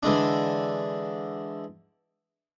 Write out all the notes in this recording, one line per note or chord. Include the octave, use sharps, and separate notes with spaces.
D3 E3 G#3 D4